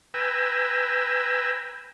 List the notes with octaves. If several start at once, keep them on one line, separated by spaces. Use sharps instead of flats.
B4 G5 G#5 A#5 E6